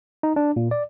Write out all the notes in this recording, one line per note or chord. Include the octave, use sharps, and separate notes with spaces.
D#4
D4
A#2
D5